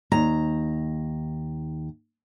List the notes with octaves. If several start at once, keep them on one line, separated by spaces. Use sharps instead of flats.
D#2 A#5